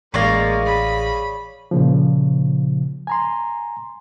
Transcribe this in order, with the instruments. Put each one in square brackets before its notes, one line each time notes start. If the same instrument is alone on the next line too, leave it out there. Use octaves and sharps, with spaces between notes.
[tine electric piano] A1 A#6 [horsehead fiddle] G#3 A#3 [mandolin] C#5 D5 F5
[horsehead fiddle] G#4 [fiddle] B5
[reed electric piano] A#2 C#3 F3
G#5 A#5 C6